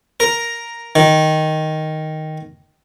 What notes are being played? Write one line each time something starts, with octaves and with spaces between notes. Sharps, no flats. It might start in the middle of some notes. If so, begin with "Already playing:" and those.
A#4
D#3